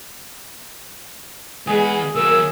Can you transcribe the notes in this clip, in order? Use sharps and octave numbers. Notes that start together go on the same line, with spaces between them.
E2 G#3 B3 G#4 B4
D#2 F#3 A#4 E6